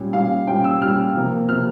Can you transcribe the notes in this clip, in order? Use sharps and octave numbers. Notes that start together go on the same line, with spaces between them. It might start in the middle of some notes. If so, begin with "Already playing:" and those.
Already playing: A#2 G3 C#4
A#2 G3 C#4 F5
A#2 G3 C#4 G5
E6
A#2 G3 C#4 F6
C3 F3 A#3
C3 F3 A#3 F6